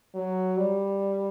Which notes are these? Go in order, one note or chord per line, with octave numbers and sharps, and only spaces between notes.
F#3
G3